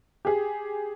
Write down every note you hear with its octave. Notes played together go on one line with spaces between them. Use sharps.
G4 G#4